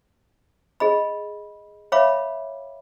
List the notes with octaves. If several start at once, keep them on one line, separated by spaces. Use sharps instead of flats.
G#4 D#5 B5
C#5 E5 F5 B5 D6